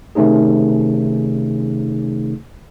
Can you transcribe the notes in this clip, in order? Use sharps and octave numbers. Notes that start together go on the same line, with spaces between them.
C3 D#3 A3 C#4 D#4 G#4